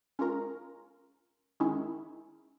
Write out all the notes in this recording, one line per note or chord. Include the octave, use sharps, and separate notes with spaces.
G#3 C#4 F4 A#4
D#3 G#3 C#4 E4